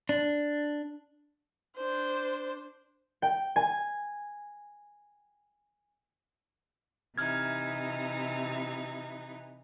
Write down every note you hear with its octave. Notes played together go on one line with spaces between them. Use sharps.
D4
D4 C5
G5
G#5
C3 E3 D#4 F6 G#6